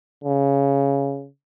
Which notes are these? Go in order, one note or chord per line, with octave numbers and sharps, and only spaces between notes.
C#3